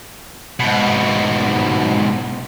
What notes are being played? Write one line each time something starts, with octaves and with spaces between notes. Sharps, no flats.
G#2 B2